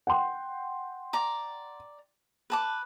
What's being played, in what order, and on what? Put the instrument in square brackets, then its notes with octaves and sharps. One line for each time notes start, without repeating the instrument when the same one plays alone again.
[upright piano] F#5 G5 C6
[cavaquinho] D5 A#5 D6
B4 A5 D6